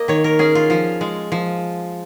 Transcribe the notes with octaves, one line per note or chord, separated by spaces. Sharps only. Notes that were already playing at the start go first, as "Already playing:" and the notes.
Already playing: A#3 D#5
D#3 C#5
A#4
C#4 G#4
F4
F3 F4
G#3
F3